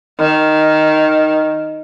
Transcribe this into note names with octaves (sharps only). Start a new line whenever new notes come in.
D#3